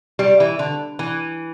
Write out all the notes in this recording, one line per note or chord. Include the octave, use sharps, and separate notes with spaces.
G3
E3
D3
E3